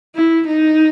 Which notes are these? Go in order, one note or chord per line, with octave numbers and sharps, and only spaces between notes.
E4
D#4